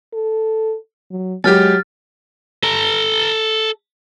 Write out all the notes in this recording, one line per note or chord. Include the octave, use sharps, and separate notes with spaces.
A4
F#3
F#3 G#3 G4 F6 A6
A4 A#5